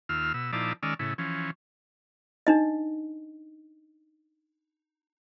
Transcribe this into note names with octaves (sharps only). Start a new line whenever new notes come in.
D#2 F4 E6 F6
B2 E6
A#2 F3 D#4 E4 D5 A5
D#3 G#3 C#4 D5 E6 F6
A2 C#3 E4
E3 F3 C#4
D4 D#4 D#5